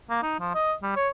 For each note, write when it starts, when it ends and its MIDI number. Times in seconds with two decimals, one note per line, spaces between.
0.10 0.22 58
0.23 0.37 63
0.40 0.54 53
0.55 0.74 75
0.82 0.91 55
0.96 1.09 73